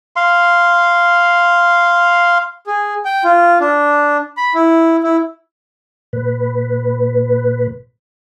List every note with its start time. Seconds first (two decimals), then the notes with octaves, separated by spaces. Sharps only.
0.16 F5 C6
2.67 G#4
3.05 G5
3.24 F4
3.60 D4
4.37 B5
4.54 E4
5.03 E4
6.13 A#2 B4